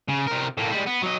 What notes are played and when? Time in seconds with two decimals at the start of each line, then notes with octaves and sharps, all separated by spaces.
0.08 C#3
0.27 C3 A#4
0.57 A2 A#3
0.71 G3 G#3
0.87 B3
1.03 F#3 D#5